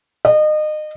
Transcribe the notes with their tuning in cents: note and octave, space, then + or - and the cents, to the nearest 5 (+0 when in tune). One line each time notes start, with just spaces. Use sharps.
D#5 -30